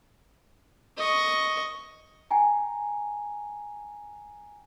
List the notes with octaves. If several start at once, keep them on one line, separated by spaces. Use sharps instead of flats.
D#5 C#6
G5 G#5 A#5